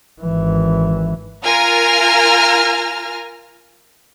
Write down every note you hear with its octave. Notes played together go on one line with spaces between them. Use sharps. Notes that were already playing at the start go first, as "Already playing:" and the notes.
G#1 E3
F4 A#4 G#5 A#5 F6